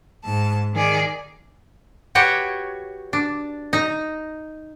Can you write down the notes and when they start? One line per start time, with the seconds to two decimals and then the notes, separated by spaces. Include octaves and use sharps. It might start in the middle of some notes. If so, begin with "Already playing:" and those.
0.24 G#2 A5
0.74 D#3 G#4 D5
2.15 F#4 G4 B4 C#5 F#5 G5
3.13 D4
3.73 D#4 A#5